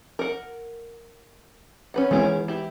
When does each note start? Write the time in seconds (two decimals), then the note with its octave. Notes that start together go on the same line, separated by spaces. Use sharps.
0.19 A#4 F#5
1.94 C#4 B4 F#5
2.11 D#3 E3 G#3 B3 C#4 G#4
2.48 E4 G4